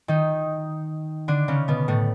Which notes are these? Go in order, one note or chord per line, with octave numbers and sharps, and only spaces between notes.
D#3 D#4
D3 D4
C#3 C#4
B2 B3
A2 A3